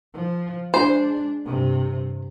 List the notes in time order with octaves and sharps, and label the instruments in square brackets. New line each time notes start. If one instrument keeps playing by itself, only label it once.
[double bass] F3
[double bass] G#3 D4 [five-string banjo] C5
[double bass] G2 C3